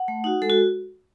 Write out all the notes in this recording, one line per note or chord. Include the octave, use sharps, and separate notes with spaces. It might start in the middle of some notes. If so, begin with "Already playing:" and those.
Already playing: F#5
A3
D#4 F#4
G#3 A4
F#4